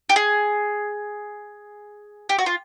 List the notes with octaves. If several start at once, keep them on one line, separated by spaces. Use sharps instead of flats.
G4
G#4
G4
F#4
F4